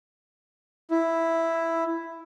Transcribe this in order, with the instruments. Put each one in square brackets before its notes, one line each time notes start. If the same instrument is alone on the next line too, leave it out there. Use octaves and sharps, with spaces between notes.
[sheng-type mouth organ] E4